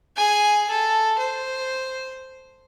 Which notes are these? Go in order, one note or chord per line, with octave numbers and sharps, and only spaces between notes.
G#4 G#5
A4
C5